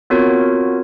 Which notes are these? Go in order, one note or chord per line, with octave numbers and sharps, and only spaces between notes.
B3 C4 F4 F#4 A#4 C#5